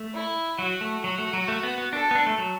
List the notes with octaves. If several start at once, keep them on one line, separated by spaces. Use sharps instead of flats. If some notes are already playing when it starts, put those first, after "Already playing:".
Already playing: A3
E4
F#3 F#4
A3
F#3 F#4
A3
F#3
A3
B3
B3
D4 A4
B3
D4
A3
F#3